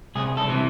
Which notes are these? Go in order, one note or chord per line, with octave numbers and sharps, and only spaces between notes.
C2 G#4
A4
C3 E3